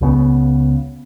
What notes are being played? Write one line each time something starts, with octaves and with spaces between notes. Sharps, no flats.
C#2 C#3 B3